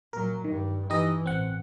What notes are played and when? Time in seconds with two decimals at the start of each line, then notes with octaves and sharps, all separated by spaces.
0.13 A#2 F#3 A#4
0.45 G2 D#3
0.90 E3 D#4 G4 D#5
1.26 A1 C4 F#5